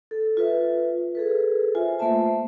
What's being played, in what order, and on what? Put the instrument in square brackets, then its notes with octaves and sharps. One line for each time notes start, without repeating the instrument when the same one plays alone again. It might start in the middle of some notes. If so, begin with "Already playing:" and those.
[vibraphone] A4
F4 B4 E5
G#4 A4 B4
F4 C5 E5 G#5
A3 A#3 C5 E5 A5